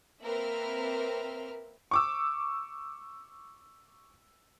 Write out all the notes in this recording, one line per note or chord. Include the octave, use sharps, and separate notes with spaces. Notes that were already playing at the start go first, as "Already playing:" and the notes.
A#3 C4 A#4 B4 E5 F6
C#6 D6 E6